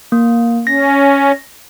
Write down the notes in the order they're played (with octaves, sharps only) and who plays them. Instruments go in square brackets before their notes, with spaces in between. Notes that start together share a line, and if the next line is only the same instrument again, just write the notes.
[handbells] A#3
[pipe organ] C#4 [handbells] A#6